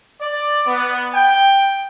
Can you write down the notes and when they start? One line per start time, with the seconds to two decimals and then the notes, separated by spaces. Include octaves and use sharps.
0.22 D5
0.67 B3
1.14 G5